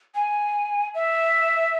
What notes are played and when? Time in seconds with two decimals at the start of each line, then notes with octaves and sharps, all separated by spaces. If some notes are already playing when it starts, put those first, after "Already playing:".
0.15 G#5
0.94 E5